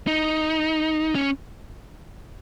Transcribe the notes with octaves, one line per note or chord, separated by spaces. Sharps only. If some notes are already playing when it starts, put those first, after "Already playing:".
D#4
C#4